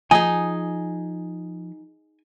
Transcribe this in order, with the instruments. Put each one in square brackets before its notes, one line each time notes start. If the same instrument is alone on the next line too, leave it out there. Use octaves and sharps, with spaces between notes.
[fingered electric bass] F3 [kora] D#4 G#4 [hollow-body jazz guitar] G#5